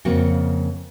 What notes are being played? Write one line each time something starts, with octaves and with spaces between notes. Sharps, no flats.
F2 C#3 A#3 C4 F#4